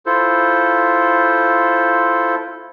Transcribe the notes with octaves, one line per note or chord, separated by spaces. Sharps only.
E4 F4 A4 C5